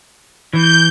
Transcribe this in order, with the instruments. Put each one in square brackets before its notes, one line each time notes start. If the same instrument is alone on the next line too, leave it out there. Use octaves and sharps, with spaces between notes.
[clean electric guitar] E3 [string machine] G6